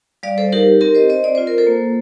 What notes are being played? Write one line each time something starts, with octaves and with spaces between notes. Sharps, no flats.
G3 D5 F5
A4 C5
D#4 G4 A#4
C4 G4 A#4
C5 D#5
C4 C5 D#5
D5
F4 C5
A#4
A4 C5
A#3